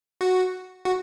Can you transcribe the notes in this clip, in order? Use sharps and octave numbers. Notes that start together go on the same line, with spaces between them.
F#4
F#4